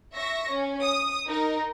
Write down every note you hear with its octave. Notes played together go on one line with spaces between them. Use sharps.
E5 C#6 A#6
C#4
D#6
D#4 A#4